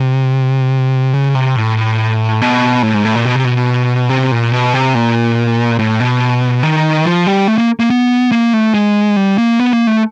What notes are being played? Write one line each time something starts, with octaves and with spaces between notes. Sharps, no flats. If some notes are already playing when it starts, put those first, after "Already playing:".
Already playing: C3
C#3
C3
A2
B2
A2
G#2
A2
A#2
B2
C3
B2
C3
A#2
B2
C3
A#2
A2
B2
D#3
F3
G3
A3
A#3
A#3
B3
A#3
A3
G#3
G3
A#3
B3
A#3
A3